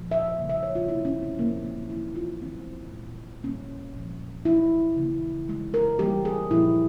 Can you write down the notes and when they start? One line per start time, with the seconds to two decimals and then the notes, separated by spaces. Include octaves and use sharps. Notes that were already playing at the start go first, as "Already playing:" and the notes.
Already playing: A#2 F3 G#3
0.11 E5
0.37 C#3 G3 A#3
0.50 E5
0.63 C#5
0.75 F4
0.88 C3 G3 A#3 E4
1.05 C#4
1.22 C4
1.39 A#2 F3 G#3 A#3
1.65 C4
1.90 E3 A#3 E4
2.16 F4
2.42 E3 G#3 C4
2.92 A#2 G#3
3.43 A#2 G3 A#3 C#4
3.95 A#2 F3 G#3
4.45 E3 G#3 E4
4.97 C#3 E3 A#3
5.48 E3 G#3
5.74 A#4
5.99 E3 G3 A#3 G4
6.25 G#4
6.50 A#2 F3 A#3 E4